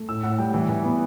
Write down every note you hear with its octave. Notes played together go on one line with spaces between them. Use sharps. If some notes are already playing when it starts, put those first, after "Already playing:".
Already playing: A3
A2 E6
A2 F#5
G3 G5
E3
E3
B3